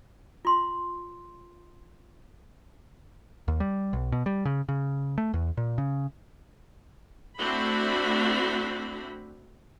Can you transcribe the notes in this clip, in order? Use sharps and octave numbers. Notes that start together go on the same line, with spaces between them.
F4 C6
D#2
G3
B1
B2
G3
C#3
C#3
A3
E2
A#2
C#3
A3 C4 D4 E4 F#4 B5